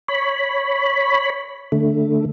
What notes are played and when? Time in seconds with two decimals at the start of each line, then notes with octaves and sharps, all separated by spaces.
0.08 C#5 B5
1.72 D3 A3